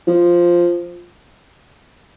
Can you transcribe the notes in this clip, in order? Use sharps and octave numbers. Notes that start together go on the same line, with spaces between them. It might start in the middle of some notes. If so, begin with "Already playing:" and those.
F3